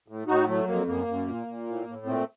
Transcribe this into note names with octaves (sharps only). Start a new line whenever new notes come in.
A2
A2 D#4 F#4
F#3 A3
F2 A#3
F#2 A#3
F#2
A#2
A#2
A2
A2
A#2 A3 C4